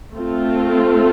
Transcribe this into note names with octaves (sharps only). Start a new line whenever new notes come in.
A3 C4 F4